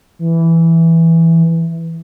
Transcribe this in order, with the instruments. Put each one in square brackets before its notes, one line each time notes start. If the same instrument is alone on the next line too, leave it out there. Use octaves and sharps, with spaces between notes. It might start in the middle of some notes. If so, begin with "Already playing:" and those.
[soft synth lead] E3